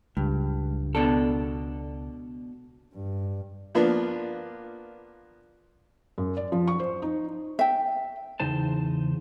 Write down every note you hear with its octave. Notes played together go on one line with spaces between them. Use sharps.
C#2 G2
B2 D4 A4
G2
F3 A#3 B3 D4 F4
F#2
D5
F3
C#6
C5
D#4
E5 G5
E2 C#3 D#4 C5 A5